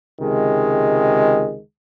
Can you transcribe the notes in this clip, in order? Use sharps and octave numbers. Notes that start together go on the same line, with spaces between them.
C#2 C3 D#3 G#3